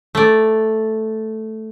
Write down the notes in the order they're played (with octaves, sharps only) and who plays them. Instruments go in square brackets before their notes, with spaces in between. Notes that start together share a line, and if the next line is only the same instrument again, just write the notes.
[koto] A3 D5